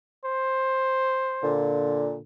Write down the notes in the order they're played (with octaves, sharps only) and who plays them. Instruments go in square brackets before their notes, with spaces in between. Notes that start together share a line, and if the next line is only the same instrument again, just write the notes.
[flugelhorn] C5
[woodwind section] A#2 D3